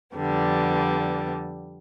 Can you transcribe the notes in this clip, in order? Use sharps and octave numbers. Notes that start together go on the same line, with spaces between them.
F2 D3 G3 B3